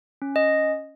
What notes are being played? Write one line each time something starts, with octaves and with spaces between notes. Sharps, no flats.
C#4
D#5